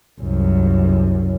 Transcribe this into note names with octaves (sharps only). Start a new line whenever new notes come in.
C2 F#2